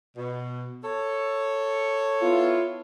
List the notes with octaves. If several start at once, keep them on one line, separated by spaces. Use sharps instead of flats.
B2
A4 C#5
B3 E4 F4